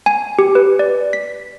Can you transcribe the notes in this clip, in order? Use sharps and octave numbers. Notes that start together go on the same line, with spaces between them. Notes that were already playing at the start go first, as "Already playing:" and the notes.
G#5
G4
B4
D5
B6